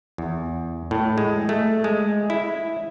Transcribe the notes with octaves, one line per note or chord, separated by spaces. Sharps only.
E2
A2
G#3
A3
G#3
E4